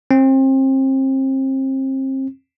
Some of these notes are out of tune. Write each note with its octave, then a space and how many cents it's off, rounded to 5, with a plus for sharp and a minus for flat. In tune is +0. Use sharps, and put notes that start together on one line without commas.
C4 +30